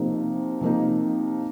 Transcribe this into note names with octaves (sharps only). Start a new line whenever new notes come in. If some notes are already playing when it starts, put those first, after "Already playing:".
Already playing: C3 F3 A#3 D#4
C3 F3 A#3 D#4